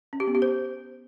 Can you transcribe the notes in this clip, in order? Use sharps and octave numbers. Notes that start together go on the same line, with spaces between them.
C#4
G4
B3
G4
C5